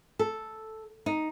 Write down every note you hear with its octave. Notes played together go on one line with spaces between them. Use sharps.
A4
D#4